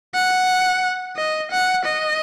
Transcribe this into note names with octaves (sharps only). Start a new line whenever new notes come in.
F#5
D#5
F#5
D#5